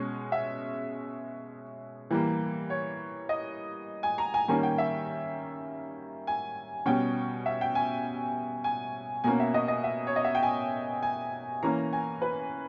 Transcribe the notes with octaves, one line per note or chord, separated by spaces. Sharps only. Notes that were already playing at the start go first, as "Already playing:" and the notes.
Already playing: B2 G#3 C#4
E5
E3 G3 A#3
C#5
D#5
G#5
A#5
G#5
D#3 G3 A#3 C#4 G#5
G5
E5
G#5
B2 G3 C#4 G5
E5
G5
G#5
G#5
B2 A#3 C#4 G#5
E5
D#5
D#5
E5
C#5
D#5
E5
G5
G#5
G#5
E3 A#3 C#4 A#5
G#5
B4